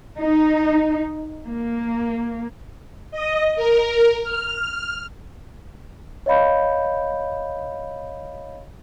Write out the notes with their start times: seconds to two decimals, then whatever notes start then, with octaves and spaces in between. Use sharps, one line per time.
0.18 D#4
1.47 A#3
3.11 D#5
3.56 A#4
4.22 F6
6.26 C#5 D#5 F5 B5 G6